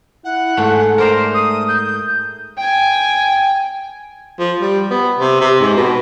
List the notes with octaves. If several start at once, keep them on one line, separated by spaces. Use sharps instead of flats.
E4 F#5
G#2 A3 A4
A3 A#4 C5 D5 A#5
D#6
G6
G5 G#5
F3
G3
B3
C3
C3
G#2
B2